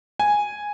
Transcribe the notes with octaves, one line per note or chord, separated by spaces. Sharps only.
G#5